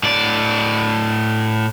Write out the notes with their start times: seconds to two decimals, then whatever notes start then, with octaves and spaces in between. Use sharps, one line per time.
0.03 A2 D5